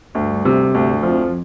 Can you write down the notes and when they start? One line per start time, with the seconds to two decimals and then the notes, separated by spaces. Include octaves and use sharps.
0.15 D2 G2
0.45 C3
0.75 D2
1.03 F2 F3